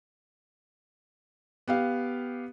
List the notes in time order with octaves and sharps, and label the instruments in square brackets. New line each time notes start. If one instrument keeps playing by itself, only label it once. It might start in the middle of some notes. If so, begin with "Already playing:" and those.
[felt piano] B3 G4 F5